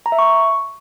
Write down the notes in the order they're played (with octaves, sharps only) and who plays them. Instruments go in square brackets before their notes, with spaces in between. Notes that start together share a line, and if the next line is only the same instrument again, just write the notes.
[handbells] A#5
E5
C#6